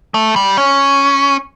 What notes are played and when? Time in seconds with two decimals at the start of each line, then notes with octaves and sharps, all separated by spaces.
0.14 A3
0.36 G3
0.58 C#4